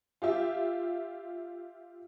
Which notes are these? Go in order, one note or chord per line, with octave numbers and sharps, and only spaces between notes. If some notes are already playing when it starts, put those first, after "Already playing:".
F4 G4 E5